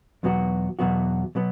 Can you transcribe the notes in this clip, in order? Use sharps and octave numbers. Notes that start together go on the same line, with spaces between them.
E2 B2 F#3 B3 F#4
E2 B2 F#3 B3 F#4
B2 F#3 B3